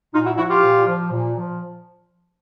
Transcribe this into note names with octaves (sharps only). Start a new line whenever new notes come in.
A#2 D#4 F4
E4 F#4
F3 E4 F#4
F4 G4
A#2
F3
A#2
F3